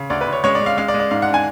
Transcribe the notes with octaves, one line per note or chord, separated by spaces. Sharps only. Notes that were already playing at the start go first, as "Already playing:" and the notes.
Already playing: C#3
D2 D5
B4
D2
C#5
G#3 C#5
D5
G#3
F5
G#3 F5
D5
G#3
D5
G#2 F5
F#5
D4
G#5